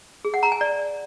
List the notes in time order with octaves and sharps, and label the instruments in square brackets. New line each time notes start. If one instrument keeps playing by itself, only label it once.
[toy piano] G#4
F#5
A#5
G#5
D5